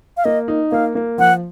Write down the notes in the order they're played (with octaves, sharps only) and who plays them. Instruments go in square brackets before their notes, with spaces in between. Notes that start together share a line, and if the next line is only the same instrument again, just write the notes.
[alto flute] F5
[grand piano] A#3 [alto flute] D#5
[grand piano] D#4
[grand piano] A#3 [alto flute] F5
[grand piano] A#3
[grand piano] F3 [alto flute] F#5